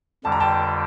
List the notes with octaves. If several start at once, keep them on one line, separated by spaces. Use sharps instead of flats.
F2 D3 G3 A5
A#5
G5 A5